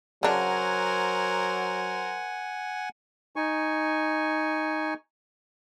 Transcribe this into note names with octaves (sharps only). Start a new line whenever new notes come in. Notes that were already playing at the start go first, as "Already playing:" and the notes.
C#3 F#3 D4 A#4 C5 F#5 G#5
D#4 G#5 C#6